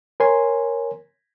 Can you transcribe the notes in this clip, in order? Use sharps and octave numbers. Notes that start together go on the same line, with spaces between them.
A#4 C#5 G#5 C6